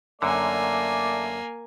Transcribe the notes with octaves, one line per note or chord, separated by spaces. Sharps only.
F#2 D3 A3 A#3 D5 G#5